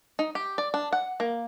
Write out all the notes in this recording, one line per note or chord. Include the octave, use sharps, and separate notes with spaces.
D#4
G4
D5
D4
F#5
A#3